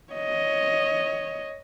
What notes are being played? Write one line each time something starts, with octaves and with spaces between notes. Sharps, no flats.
C#5 D#5